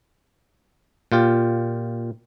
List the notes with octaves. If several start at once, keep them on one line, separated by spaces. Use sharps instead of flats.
A#2 F4 G4